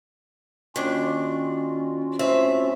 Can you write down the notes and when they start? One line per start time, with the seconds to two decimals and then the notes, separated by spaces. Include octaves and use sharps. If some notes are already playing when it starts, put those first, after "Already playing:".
0.76 D#2 C#4 D4 F4 F#4
2.19 A2 C4 E5